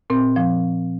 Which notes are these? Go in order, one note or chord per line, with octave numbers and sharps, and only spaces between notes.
A#2 C4
F3